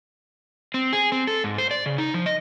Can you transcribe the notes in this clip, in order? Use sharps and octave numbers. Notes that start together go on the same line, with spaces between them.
C4
G#4
C4
A4
G#2
C5
D5
C#3
D#4
F3
D#5